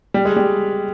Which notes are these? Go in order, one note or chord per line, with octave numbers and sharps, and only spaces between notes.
G3
G#3
G3